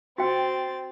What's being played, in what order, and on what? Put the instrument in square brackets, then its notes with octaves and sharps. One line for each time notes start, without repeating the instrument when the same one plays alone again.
[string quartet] C4 A6 [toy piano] F#4 G5